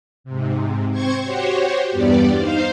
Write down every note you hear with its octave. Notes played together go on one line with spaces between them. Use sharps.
G#2 C3
C4 C5 C#6 G#6
F#4 G4 C5 C#5
E2 G2 G3 B3 G4 D5
D#4 C5 F5